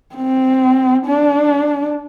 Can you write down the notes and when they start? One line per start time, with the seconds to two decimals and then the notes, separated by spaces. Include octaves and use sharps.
0.15 C4
1.06 D4